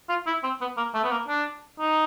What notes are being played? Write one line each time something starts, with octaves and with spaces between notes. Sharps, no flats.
F4
E4
C4
B3
A#3
A3
B3
A#3
D4
D#4